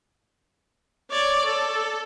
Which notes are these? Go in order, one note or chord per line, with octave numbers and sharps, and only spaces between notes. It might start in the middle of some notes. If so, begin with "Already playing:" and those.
C#5 D5
A4